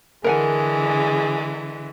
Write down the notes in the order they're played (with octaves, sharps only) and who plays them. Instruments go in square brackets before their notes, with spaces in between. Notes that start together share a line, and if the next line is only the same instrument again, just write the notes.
[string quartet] D3 E3 G#3 [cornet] G#4 [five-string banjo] A#4 F#5 G#5